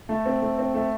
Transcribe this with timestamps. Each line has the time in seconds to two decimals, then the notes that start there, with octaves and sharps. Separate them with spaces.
0.09 A3
0.26 C4
0.42 A3
0.59 C4
0.74 A3